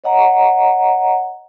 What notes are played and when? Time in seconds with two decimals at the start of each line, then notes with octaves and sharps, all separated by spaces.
0.04 C#5 D#5 F#5 A#5